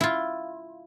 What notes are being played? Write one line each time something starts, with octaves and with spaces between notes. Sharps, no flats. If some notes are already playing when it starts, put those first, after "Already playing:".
E4 F4